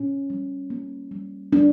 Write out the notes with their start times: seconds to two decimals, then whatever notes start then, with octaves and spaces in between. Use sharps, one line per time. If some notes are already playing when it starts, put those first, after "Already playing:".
Already playing: A#2 C#4
0.30 G3
0.70 A#3
1.11 G3
1.53 G3 D4